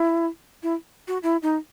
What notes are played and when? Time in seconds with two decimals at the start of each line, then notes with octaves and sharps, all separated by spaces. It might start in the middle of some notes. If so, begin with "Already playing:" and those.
Already playing: E4
0.63 E4
1.08 F#4
1.23 E4
1.42 D#4